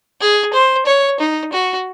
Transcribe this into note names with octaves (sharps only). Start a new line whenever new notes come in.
G#4
C5
C#5
D#4
F#4